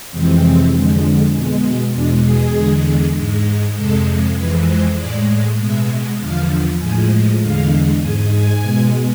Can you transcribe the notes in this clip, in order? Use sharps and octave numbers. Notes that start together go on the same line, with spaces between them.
F2 C3 E3 G#3 C4
F2 D3 G#3
B2 G#3
E2 B2 G#3 D4
G#4
E2 D3 G#3
G#2 G#3
F2 C3 G#3 A4
F2 E3 G#3 B4
C5
A2 G#3 D5
B2 G#3 E5
E2 D3 F3 F5
A2 F3 G#3 G#5
E2 D3 G#3 F5
G#2 G#3 G#5
G#5
B2 G#3